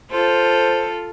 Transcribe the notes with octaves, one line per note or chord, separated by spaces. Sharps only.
F4 A4 C5